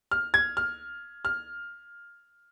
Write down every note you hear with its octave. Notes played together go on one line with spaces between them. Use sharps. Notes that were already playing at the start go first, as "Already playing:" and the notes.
F6
G#6
F6
F6